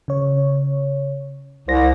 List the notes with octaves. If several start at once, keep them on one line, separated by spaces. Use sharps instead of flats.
C#3 C#5
C2 C5 A#6